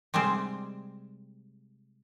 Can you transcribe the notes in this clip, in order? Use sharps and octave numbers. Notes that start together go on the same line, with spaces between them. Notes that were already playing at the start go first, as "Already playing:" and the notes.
C3 G3 G#3 C4